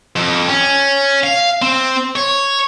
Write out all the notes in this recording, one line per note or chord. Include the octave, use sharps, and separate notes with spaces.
F2
C#4
F5
C4
C#5